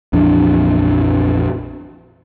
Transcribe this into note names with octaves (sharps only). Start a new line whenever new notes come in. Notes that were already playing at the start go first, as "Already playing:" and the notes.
A#1 F2 E3 D4